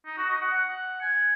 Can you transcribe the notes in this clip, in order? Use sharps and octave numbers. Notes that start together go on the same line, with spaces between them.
D#4
F#4
D#5
F#5
F#5
G#5